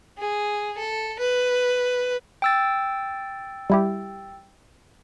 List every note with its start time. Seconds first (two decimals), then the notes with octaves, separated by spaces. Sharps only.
0.18 G#4
0.78 A4
1.19 B4
2.42 G5 E6 A6
3.70 G3 E4 G4